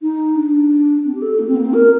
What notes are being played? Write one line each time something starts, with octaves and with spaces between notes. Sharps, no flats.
D#4
D4
C4
G4
A4
A#3
C4
A#3
C4
A#4